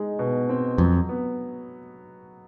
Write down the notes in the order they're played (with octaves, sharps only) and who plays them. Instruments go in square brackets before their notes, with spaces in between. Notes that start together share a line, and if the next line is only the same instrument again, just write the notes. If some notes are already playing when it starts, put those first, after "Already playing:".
Already playing: [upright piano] G#3 D#4
B2
C4
[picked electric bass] F2 [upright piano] F#3
[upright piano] B3